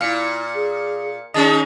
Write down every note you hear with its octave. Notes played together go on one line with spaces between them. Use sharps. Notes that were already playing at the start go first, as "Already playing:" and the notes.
A#2 E4 F5 C#7
G#4
D#3 C#4 D#4 G#4 D#5 A5